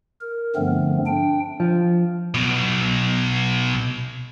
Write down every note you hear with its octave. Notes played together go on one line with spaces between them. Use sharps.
A#4
G2 D3 F3 A3 B3 C4
D4 G5
F3
B1 B2